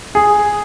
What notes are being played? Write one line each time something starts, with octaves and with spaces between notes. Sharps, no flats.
G#4